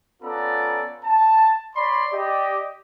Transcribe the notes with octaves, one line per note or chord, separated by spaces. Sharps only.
B3 C#4 F4 A4 D5 A#5
A5
C#5 D5 B5 C6
G4 D5 D#5